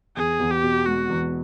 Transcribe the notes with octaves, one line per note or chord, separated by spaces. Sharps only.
E2 G#4
E2
G4
B2
G#3 F#4
E2